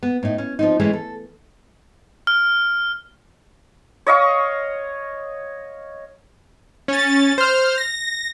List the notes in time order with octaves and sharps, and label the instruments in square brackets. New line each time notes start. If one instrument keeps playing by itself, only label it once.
[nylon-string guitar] B3
A2 D#4
C#4
F3 C4 D#4
E3 G#3 A3 C#4
A4
[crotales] F6
[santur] C#5 D#5 F5 C#6
[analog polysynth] C#4 A6
C5 F6
A#6